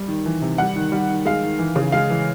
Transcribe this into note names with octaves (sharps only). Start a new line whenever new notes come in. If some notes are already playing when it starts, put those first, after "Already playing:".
Already playing: G3
D#3
E3
C3
G3 F#5
D#3
G3
D#3
G#3 F5
D#3
E3
C#3
G#3 F5
E3